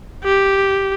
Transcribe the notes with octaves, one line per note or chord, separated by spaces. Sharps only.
G4